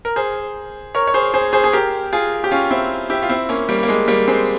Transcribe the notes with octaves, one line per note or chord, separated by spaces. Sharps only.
A#4
G#4 C5
A#4 C#5
C#5
G#4 C5
G#4 C5
G#4 C5
G#4
G4 A#4
F4 G#4
G4
C#4 F4
C4 E4
E4 G4
F4
C4 E4
A#3 C#4
G3 A#3
A#3
G#3
G3 A#3
G#3 C4